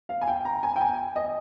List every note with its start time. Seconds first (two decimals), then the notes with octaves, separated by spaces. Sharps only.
0.09 F5
0.21 G#5
0.28 G5
0.45 A#5
0.63 G#5
0.76 G5
0.81 G#5
1.16 D#5